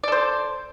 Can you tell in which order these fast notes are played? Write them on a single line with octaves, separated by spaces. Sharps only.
D5 A4 C5